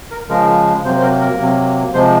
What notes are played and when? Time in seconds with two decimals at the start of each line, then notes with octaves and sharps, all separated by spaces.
0.11 A#4
0.29 C#3 F3 G#3 A#4
0.84 C3 F#3 A#3 C5
0.97 C5
1.02 A#4
1.21 A#4
1.40 C3 F#3 A#3
1.94 C3 F3 G#3 C5